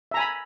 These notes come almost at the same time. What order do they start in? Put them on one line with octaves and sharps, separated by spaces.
E5 A#5 G#5 B5